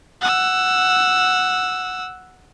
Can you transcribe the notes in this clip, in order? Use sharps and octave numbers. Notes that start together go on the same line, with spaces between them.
F#5 E6